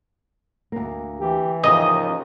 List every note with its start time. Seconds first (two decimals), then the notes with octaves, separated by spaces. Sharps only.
0.72 D2 A#3
1.20 E3 G4
1.64 D#2 C#3 F3 D#5